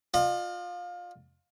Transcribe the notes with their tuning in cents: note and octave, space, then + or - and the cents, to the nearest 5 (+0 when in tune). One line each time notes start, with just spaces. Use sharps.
F4 +20 D#5 -45